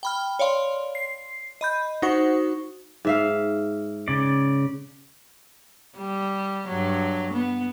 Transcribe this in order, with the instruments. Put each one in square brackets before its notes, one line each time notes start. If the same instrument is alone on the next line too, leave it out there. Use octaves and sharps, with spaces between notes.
[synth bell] G5 B5 F6
C#5 D5 F5 C6
C7
D#5 B5 G6
D#4 F#4 C5 F#5 C#6
[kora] G#2 E5 F5
[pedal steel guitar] C#3 D5
[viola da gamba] G3
G2 F#3
B3